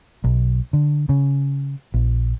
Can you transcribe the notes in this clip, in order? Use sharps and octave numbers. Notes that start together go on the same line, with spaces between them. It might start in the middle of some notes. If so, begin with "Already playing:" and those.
B1
D3
C#3
A#1